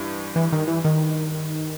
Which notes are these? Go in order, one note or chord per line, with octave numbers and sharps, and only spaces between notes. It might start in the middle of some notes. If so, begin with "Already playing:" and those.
Already playing: G2 E3
E3
D#3
E3
D#3